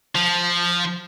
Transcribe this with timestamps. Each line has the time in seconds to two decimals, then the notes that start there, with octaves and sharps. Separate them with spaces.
0.15 F3